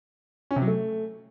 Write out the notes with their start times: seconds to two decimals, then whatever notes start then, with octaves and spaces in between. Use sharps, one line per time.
0.51 C#4
0.56 C3
0.62 F#3
0.67 A3